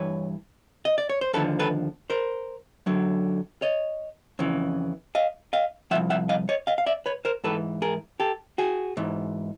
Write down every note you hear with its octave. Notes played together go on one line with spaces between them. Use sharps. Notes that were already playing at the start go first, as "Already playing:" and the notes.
Already playing: G2 E3 B4 C#5
D#5
D5
C#5
C5
D#2 D3 F3 A4 B4
A4 B4
A#4 C5
F#2 D3 F#3
C#5 D#5
F2 C#3 E3
D#5 F5
D#5 F5
C2 A#2 F3 E5 F#5
E5 F#5
D#5 F5
C#5 D#5
D#5 F5
F5
D5 E5
B4 C#5
A#4 C5
G#2 E3 A4 B4
G#4 A#4
G4 A4
F#4 G#4
G#2 E3